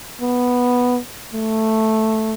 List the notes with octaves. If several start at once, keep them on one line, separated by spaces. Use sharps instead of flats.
B3
A3